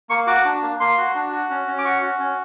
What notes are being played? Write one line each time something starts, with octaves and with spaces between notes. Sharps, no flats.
A#3 C#6
F#4 D6
D4
A#3
A#3 C6
F#4
D4
F#4
C#4
C#4
D6
F#4 C#6
F#4
C#4